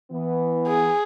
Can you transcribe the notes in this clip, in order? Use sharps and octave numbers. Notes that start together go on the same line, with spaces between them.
E3 B3
G#4